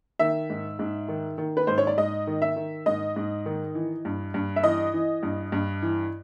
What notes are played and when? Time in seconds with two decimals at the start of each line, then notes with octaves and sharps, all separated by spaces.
0.19 D#3 E5
0.50 G#2
0.79 G#2
1.08 D#3
1.38 D#3
1.57 B4
1.67 G#2 C5
1.78 C#5
1.87 D5
1.98 G#2 D#5
2.27 D#3
2.42 E5
2.56 D#3
2.86 G#2 D#5
3.16 G#2
3.46 D#3
3.75 E3
4.05 G2
4.34 G2
4.56 E5
4.64 E3 D#5
4.93 E3
5.23 G2
5.52 G2
5.82 E3